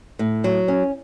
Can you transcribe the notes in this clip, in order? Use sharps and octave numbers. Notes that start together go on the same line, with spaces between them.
A2
F#3
C#4